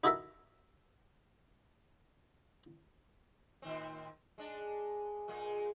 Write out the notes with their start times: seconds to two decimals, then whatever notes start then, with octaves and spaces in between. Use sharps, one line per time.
0.04 D#4 E4 F#4 A4 A#4 E5
3.62 A2 D#3 C4
4.38 G#3 D4
5.28 A#2 G#3 G#4